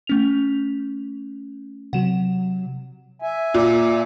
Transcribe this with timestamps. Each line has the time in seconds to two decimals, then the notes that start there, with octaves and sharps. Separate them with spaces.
0.07 A3 C#4 F7
1.93 C3 F#3 F#5 E7
3.22 E5 G#5
3.54 A#2